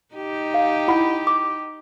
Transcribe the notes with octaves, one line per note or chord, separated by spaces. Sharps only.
D#4 G4
F5
E4 F#5 B5
D6